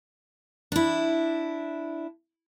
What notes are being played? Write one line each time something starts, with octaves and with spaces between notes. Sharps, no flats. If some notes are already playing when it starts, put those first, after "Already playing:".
D4 E4